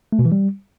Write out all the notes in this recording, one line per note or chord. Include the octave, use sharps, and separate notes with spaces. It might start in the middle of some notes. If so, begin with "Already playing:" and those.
A3
B2
E3
G3